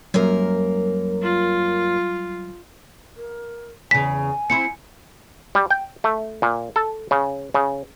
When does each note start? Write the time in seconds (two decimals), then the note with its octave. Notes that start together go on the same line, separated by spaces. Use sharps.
0.14 F#2 F#3 G3 A#3 A#4
1.23 F4
3.17 A#4
3.91 E2 C#3 G#5 B6
4.50 C4 E4 C5 C#7
5.55 G3
5.70 G5
6.04 A3
6.42 A#2
6.76 A4
7.11 C#3
7.54 C#3